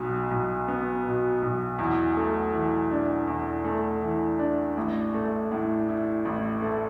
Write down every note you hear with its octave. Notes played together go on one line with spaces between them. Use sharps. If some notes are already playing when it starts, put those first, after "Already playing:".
Already playing: B1 B2 B3
B1
B3
B2
B1
E2
A3
E3
D4
E2
A3
E3
D4
A1
A3
A2
E4
A1
A3